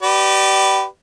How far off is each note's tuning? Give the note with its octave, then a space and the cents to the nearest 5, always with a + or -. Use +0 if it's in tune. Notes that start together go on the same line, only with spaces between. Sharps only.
G4 -30 B4 +0 D5 +15